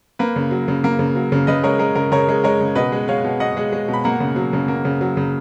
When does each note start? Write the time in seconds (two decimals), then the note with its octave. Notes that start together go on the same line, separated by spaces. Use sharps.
0.19 A#3 B4
0.36 C#3
0.51 F#3
0.68 C#3
0.84 A#3
0.99 C#3
1.16 F#3
1.32 C#3
1.47 C#3 B4 D#5
1.63 G#3 A#4 C#5
1.79 G#3 A#4
1.95 C#3 A#4
2.12 C#3 A#4 C#5
2.28 G#3
2.44 G#3 A#4 C#5
2.61 C#3
2.75 B2 B4 D#5
2.92 G#3
3.08 G#3 C#5 F5
3.24 B2
3.40 B2 D#5 F#5
3.57 G#3
3.72 G#3
3.88 B2
3.93 B5
4.04 A#3 F#5 A#5
4.20 C#3
4.36 F#3
4.53 C#3
4.68 A#3
4.85 C#3
5.01 F#3
5.17 C#3